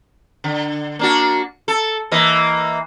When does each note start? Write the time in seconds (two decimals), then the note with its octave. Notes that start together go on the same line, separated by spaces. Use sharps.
0.44 D3
0.99 A#3 D4 F#4
1.68 A4
2.12 E3 A#3 D#5